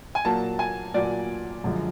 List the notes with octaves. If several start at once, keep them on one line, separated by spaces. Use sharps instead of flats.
G#5
A#2 F#3 A#3 A5
G#5
A#2 F#3 A#3 D5
F#2 D3 F3 G#3